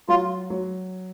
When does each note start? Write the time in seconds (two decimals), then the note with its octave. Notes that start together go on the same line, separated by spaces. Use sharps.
0.08 F#3 F4
0.50 F#3